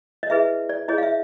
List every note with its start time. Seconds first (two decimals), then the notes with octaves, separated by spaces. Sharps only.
0.23 D#5
0.30 E4 G#4 B4 E5
0.69 D5
0.88 E4 G#4 C#5 D#5
0.98 F5
1.03 E5